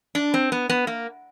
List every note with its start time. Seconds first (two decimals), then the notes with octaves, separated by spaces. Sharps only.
0.15 D4
0.34 C4
0.52 B3
0.70 B3
0.87 A#3